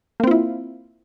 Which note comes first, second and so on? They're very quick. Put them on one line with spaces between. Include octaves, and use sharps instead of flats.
A#3 C4 F4 E4